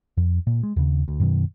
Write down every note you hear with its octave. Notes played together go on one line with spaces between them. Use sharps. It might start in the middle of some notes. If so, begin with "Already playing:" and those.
F2
A#2
G#3
D#2 C#3
D2
F#2 B2 D#3